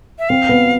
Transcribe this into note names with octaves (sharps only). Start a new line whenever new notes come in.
E5
C4 F5
B3